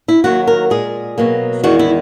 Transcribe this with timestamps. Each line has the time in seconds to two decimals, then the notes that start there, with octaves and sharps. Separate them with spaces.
0.08 E4
0.24 D#2 D#3 F#3 A#3 F#4
0.47 A#4
0.70 A#2 G#3 G#4
1.18 B2 F#3 A#3
1.63 E2 D#3 G#3 F#4
1.79 E4